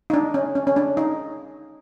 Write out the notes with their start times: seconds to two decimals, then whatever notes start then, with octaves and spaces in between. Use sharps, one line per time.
0.10 D#4
0.14 D4
0.34 C#4
0.55 C#4
0.67 C#4
0.76 D4
0.97 D#4